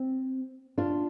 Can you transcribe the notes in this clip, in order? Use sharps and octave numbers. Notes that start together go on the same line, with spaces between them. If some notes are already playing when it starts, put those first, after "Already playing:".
Already playing: C4
D4 F4